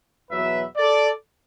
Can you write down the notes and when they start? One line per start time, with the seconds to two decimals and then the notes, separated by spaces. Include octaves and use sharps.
0.30 E2 B2 F#3 B4 E5
0.77 A4 D5